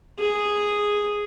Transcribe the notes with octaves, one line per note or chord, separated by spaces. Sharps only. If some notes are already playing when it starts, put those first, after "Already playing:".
G#4